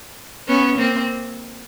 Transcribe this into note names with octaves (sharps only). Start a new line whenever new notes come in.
B3 C#4
A#3 C4